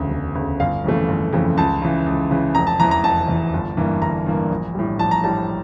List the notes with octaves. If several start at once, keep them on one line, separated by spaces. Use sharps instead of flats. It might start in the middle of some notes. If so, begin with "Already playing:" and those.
Already playing: E1 D2 C#3
E1
D2 C#3
G1 F5
F2 C#3 E3 A3
G1
F2 C#3 E3 A3
C#2 A5
C#3 E3
C#2
C#3 E3
F1 A#5
A5
E2 E3 A#5
A#5
F1 A5
E2 E3
G1
G2 E3 A#3
G1 A#5
G2 E3 A#3
A#1
A2 G3
A#1 A5
A#5
A2 G3 A5